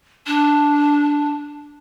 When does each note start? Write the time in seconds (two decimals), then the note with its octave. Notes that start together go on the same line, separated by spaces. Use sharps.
0.26 D4